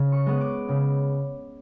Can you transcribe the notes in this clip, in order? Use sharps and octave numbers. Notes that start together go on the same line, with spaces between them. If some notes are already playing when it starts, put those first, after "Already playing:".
Already playing: C#3
C#6
G#3 B3
D6
C#3